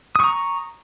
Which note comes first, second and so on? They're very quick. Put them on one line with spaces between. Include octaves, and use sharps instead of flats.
D#6 C#6 A#5